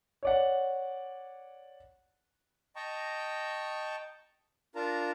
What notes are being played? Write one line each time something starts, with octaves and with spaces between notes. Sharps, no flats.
C#5 D5 F#5
D#5 G5 A5 A#5 C#6
D4 F4 A#4 A5 A#5